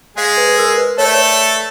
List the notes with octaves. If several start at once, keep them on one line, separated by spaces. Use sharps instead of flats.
G#3 G#4 F5
B4
B4
A#4
B4
A3 A4 C#5
D5
C#5